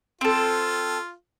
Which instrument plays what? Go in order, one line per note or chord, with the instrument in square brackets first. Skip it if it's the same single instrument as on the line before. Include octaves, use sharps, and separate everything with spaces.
[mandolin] C4 A4 [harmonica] F4